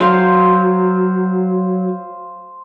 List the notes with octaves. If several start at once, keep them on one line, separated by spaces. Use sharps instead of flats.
F#3 C5 F5 C6